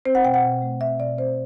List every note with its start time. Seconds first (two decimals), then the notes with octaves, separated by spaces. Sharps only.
0.05 C4 C5
0.15 F#5
0.24 B2 G5
0.34 F#5
0.44 B2
0.62 A3
0.81 C4 E5
0.99 B2 D5
1.18 C4 C5